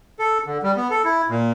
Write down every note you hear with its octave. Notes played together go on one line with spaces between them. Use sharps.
A4
D3
G3
B3
A4
E4
A#2